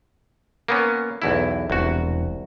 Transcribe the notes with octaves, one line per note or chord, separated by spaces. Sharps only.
A#3 B3 C#4
B1 E2 E4
E1 C2 F#4